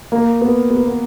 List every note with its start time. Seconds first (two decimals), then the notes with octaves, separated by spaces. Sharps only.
0.12 A#3
0.41 B3
0.70 B3
0.85 B3